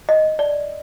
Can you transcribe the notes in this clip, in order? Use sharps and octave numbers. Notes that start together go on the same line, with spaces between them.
D#5
D5